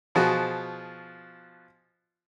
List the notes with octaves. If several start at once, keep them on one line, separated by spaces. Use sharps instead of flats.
B2 F3 F#4 G#4